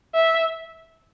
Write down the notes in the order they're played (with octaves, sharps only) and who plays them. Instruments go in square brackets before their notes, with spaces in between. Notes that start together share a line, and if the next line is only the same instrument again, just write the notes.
[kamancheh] E5